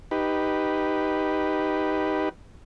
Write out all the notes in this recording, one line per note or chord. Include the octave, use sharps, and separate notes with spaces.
D#4 G4 B4